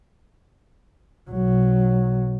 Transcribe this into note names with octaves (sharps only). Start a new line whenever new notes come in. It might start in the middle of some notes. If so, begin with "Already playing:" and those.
B1 F#3